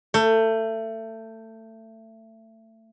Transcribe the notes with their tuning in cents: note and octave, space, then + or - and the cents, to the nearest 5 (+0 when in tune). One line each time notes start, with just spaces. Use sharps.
A3 +25